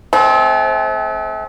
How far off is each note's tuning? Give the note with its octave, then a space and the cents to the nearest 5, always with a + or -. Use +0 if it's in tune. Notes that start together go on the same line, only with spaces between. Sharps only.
A3 -40 C4 +10